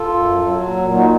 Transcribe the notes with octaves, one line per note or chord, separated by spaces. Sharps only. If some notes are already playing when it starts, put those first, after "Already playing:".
Already playing: F4 A4
F#2
F#3
F#3
A#2
A#2
D#4 F#4